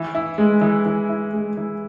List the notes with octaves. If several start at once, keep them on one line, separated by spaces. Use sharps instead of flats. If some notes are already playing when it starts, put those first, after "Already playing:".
Already playing: E3
E4
G#3
E3
E3
E4
G#3
E3